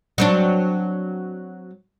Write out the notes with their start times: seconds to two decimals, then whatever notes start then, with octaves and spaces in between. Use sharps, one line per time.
0.18 F#3 C4 D4